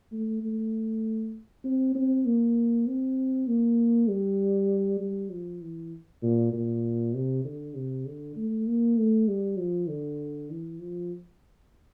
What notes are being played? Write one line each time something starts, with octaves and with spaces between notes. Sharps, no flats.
A3
A3
C4
C4
A#3
C4
A#3
G3
G3
F3
E3
A#2
A#2
C3
D3
C3
D3
A3
A#3
A3
G3
F3
D3
E3
F3